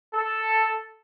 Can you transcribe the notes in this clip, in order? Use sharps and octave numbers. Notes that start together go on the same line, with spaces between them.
A4